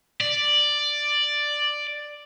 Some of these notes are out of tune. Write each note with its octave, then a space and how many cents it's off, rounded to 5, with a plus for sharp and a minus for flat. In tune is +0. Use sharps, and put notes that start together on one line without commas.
D5 +5